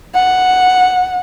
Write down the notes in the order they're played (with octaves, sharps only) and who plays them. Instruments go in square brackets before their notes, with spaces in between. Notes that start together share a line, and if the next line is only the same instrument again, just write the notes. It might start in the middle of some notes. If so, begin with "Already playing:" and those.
[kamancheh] F#5